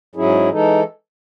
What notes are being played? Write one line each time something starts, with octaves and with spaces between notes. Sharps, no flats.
G#2 F#3 C#4 E4 G#4
E3 G#3 D#4 A4